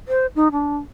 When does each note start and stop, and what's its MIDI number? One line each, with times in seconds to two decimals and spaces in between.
0.08 0.26 72
0.36 0.48 63
0.52 0.78 62